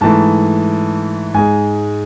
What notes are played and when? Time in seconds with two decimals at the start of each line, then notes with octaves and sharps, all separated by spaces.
0.01 G#2 E3 A3 A5
1.34 G#2 G#3 G#5